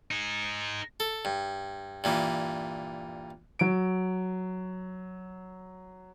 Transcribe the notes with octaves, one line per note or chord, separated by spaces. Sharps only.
D#4 G#4
A4
G2
G2 A#2 E3
F#3 D7